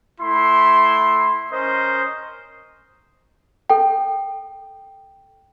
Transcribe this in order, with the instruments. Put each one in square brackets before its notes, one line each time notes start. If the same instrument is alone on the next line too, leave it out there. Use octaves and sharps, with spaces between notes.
[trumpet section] A3 E4 C6
C#4 A#4 C5 D#5
[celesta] A4 G5